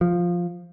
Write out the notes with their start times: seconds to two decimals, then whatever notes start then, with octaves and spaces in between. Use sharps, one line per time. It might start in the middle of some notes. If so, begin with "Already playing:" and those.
0.01 F3